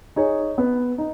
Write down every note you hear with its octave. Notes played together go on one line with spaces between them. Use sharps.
D#4 G#4 C#5
B3
D#4